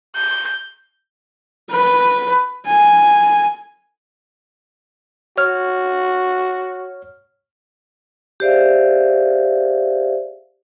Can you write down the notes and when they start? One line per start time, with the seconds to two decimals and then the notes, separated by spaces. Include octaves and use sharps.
0.16 G6
1.71 B4
2.67 G#5
5.38 F#4 C#5 F6
8.40 G4 G#4 C5 D5 E5 F5